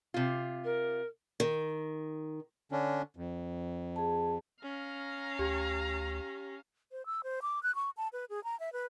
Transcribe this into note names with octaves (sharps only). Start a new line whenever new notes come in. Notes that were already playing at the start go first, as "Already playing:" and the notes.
C3 F4
A#4
D#3
D3 C#4 D4
F2
G#4 A5
C#4 F5 A#5
D2 G4
C5
E6
C5
D6
F#6
C#6
A5
B4
G#4
A#5
E5
B4